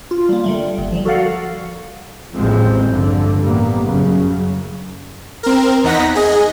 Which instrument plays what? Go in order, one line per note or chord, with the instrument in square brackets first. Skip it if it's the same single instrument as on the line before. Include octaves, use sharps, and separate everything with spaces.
[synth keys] F4
G3 A#3
D3 G3 A3
G1
F3 G3
F#4 A4 A#4 D5 F5 F#5
[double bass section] A1 D#2 A2 F3 G#3 C4
G2 D3
A1 G3 A#3 B3
F#2 C#3 F#3
[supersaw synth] C4 A#4
E2 D#4 F#5 A#6 B6
G#4 D#5